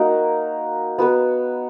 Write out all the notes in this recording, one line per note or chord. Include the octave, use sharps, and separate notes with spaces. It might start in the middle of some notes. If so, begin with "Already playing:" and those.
Already playing: A#3 D#4 F#4 A#4
B3 F#4 B4